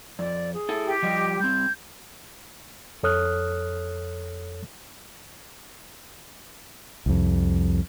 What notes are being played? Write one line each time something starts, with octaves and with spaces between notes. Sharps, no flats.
F2 D5
G#4
E4 A4
G4
F3 G3 D#5
G3 C4 G6
F2 A4 C#5 D#6 F6 F#6
C2 F2